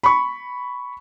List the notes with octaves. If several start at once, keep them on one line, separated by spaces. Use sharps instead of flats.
B5 C#6